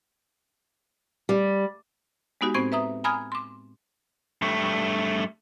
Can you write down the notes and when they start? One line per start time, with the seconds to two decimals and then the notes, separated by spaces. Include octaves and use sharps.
1.29 G3
2.41 G#3 B3 D#4 F#4 G4
2.54 A2 B3 C4 C5 C#6 G#6
2.72 B4 E5 A#5 D#6
3.04 G#5 A#5 B5 D#6 F6 G#6
3.32 C6 D6
4.42 G2 A3